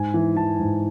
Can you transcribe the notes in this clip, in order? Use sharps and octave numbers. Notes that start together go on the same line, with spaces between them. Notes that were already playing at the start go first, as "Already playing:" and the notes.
Already playing: G#2 G#5
E3
E3 A5
G#2